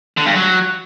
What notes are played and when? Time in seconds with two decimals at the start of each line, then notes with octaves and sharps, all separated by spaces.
0.17 D3
0.26 G2
0.35 F#3